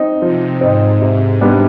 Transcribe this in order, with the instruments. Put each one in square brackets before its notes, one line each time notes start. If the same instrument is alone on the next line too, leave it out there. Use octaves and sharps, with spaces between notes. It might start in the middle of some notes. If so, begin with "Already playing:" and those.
Already playing: [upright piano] C4 D#4
[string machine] C3 [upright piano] F3
[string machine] G#2 [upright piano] C4 D#4
[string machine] G#2 [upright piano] C3
[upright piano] G3 B3 D4